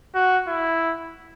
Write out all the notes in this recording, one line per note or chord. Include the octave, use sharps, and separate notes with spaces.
F#4
E4